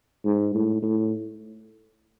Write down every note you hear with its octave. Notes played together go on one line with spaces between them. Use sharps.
G#2
A2
A2